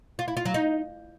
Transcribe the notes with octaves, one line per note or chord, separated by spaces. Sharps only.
F4
E4
F4
F#3
D#4